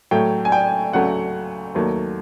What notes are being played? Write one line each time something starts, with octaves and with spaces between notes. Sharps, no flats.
A2 F#3 A3 G5
G#5
G5
D2 C#3 F#3 A3 F#5
D#2 D#3 F#3 A3